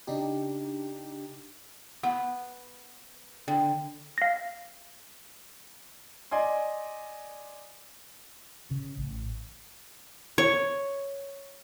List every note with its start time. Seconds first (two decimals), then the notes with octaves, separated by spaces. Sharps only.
0.07 C#3 D4 D#4 G4
2.03 B3 F#5
3.48 D3 G5
4.18 F5 A#6
6.31 D5 D#5 G#5 C6
8.71 C#3
8.98 A1
10.38 C#5